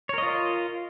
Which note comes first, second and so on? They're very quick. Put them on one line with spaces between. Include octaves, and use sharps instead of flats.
C#5 A#4 D#5 F4